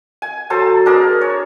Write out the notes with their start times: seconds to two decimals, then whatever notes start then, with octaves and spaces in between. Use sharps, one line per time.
0.22 G#5
0.50 F#3 A4 C5 A5
0.86 D4 G#4 A#4 A5
1.21 C#5